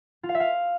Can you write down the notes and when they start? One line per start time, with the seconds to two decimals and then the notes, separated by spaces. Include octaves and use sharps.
0.23 F4
0.29 F5
0.35 E5
0.40 F5